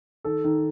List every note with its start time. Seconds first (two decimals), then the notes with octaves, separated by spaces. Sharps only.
0.24 D#3 A4
0.44 D#3